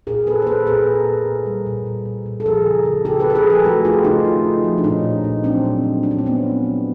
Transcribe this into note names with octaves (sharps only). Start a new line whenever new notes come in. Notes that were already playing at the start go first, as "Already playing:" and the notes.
A#2 G#4 A#4
A#3 A4 B4
C5
A#3 A4 B4
A#2 G#4 A#4
A#3
A#2
A#2
G3
A#2
A#2
A#2
A#2
A4
F3 G#4 A#4
C#3
C#3
C#3 G4 A4
C#3 A4 B4
B4
G#4 A#4
F3
G4 A4
A3 F#4 G#4
A3 F4 G4
C#3 D#4 F4
A3
C#3
F3
D4
A#2 C#4 D#4
A#2
A#2
F#3 C4 D4
A#2
F#3
A#3 D4
C#4
C4
A#2 B3 C#4
F#3
F#3